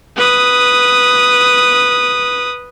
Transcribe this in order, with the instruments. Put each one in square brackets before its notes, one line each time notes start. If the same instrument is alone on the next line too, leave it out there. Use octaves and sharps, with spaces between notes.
[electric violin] B4 D#6